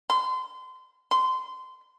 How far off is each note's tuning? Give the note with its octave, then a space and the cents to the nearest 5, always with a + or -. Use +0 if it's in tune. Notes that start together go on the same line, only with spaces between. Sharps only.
C6 -30
C6 -25